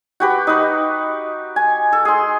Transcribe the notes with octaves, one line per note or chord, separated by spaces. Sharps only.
F#4 G4 B4
D#4 B4
G#5
A4
G#4 C6